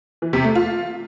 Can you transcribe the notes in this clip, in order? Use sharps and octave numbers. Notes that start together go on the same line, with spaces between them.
E3
C3
A3
F4